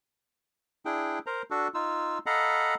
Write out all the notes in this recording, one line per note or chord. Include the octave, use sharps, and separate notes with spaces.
D4 E4 G#4 G5
A#4 C5 A#5
D4 F#4 A4
D#4 F4 E6
A4 D#5 F5 F#5 A#5 B5